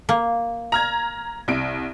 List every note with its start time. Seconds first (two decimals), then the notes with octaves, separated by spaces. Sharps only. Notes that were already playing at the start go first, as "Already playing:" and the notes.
0.09 A#3
0.72 A#5 F6 G#6
1.48 C2 D7